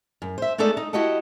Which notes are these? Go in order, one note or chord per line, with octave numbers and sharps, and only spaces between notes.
F#2
C5 E5
G#3 A3 B3 D#4 A4 D5
D#4
E4 F#4 G4 D#5 F#5 A5